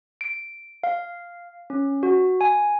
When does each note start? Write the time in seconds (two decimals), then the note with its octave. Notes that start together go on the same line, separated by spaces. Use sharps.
0.21 D7
0.84 F5
1.70 C#4
2.03 F#4
2.41 G#5